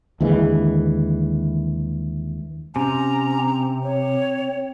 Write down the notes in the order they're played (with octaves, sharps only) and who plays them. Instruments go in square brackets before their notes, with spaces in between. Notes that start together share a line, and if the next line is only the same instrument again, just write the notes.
[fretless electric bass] D#2 D3 E3 G#3
[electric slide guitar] C3 [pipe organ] C#4 [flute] A#5
[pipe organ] C4
[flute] C#5